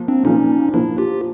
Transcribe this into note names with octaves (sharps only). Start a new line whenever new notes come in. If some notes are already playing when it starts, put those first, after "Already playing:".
Already playing: F3 A#3
C4 D4
A#2 F3 A#3 C#4 D#4
A#2 F3 A#3 D4 E4
F4 G4